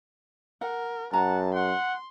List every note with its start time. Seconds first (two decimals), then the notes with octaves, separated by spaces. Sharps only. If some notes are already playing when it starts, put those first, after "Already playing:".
0.61 A#4 F#5
1.13 F#2 F#5 A5 A#5
1.55 F#5 C6